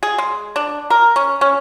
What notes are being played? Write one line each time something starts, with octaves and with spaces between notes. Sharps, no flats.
G#4
G#3
D4
A#4
C#4
C#4